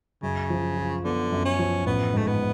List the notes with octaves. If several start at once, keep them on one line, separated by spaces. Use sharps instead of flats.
F#2 C#3
F3
F4
D3 B3
F#2
C#4
F3
A1 B3
G#2 A3
B3